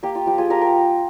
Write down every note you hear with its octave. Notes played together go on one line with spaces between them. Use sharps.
A#3 G4
F4
F3 G4
F4 G#4
F3 G4 A#4
G4 A#4